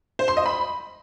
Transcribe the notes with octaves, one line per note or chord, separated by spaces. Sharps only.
C5
C6
D#5
B5